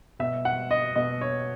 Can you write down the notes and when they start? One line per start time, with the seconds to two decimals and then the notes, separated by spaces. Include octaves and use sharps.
0.19 B2 E5
0.45 F#5
0.71 D#5
0.96 B2 D#5
1.21 C#5